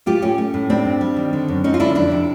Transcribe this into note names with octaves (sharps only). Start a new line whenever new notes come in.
A2 F4 G4
A3 C#4
A3
A2
G3 C4 D4
G2
G3
D#3
D3
F#2
F#3 C#4 D#4
F4
D3 D4 E4
F2 D4 E4
C3